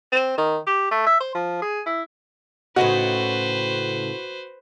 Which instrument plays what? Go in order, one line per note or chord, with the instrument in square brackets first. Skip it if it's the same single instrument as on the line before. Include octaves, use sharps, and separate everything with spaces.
[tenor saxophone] C4
D#3
G4
A3
E5
C5
F3
G#4
E4
[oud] A2 C#3 D#4 [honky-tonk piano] F#4 [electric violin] B4 C5